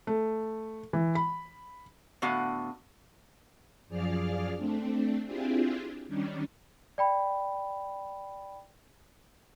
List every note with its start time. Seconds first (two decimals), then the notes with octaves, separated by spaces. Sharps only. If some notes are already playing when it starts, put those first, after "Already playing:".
0.07 A3
0.93 E3
1.15 B5
2.22 A2 D3 B3 F#4 F5 F#5
3.88 F#2 F3 G#4 D5 F5 F6
4.57 A3 C4 D4
5.25 C4 D4 E4 F4 G4 G#4
6.07 D#3 G3 C#4 D4
6.98 D5 G5 B5